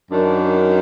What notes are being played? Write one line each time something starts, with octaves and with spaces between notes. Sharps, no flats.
F#2 D#3 F#3 D4